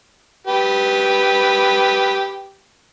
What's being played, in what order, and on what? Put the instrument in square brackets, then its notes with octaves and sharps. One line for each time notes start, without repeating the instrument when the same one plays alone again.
[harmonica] G4 B4